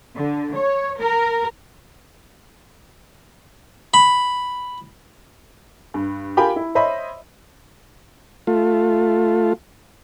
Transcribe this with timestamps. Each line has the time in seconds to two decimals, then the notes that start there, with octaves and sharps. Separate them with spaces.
0.15 D3
0.55 C#5
1.00 A#4
3.94 B5
5.94 G2
6.37 F4 G4 A#4 G5 G#5 B5
6.56 E4
6.75 C5 C#5 D#5 E5 B5
8.47 A3 F4